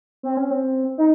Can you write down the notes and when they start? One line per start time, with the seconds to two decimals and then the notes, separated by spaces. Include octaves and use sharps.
0.23 C4
0.37 C#4
0.51 C4
0.98 D#4